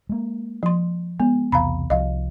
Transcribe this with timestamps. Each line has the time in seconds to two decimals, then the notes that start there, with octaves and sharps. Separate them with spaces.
0.09 G#3 A#3
0.63 F3 C6
1.20 G#3 B3
1.52 B1 E2 C3 F5 A#5 B5
1.90 C2 F3 D#5 F5